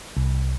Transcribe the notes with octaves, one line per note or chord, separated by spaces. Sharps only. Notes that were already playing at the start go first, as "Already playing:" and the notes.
C2